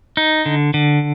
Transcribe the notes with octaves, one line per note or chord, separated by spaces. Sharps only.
D#4
D3
D3